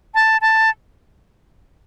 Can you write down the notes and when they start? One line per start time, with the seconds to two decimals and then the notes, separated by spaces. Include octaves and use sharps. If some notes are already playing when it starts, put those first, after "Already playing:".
0.15 A5
0.41 A5